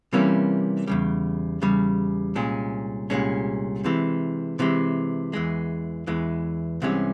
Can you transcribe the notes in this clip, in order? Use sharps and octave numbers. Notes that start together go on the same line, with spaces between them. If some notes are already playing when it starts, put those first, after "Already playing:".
C3 E3 G3 A#3 C#4
E2 C#3 G3
E2 C#3 G3
C2 A#2 G#3 C#4
C2 A#2 G#3 C#4
C3 E3 G#3
C3 E3 G#3
E2 E3 G#3
E2 E3 G#3
C2 C3 E3 G#3 C#4